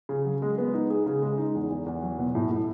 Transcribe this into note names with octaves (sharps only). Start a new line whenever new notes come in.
C#3
F#3
G#3
B3
D#4
G#4
C#3
G#3
D#4
E2
E2
E2
F#3
B2
A2
A2